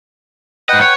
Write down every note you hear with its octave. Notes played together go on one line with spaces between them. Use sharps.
G#2 B4 D#5 F#5 G5
C#5